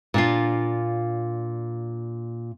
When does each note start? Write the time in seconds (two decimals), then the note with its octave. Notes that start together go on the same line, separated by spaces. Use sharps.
0.14 A#2 D4 F4